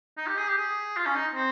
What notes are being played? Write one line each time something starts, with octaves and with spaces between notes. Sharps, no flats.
D#4
G4
G#4
G4
G#4
F4
C#4
D#4
C4